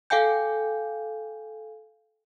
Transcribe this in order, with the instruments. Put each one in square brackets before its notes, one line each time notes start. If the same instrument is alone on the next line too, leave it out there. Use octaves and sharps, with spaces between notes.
[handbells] A4 F5 G5 G#5 G6